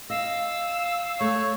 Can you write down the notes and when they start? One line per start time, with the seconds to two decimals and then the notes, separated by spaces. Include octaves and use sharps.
0.10 D#5 F5 E6
1.21 A3 C#5